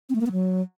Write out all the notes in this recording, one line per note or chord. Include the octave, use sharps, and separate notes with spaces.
C4
A3
A#3
B3
F#3